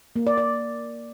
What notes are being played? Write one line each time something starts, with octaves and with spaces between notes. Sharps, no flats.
A#3
D5
D5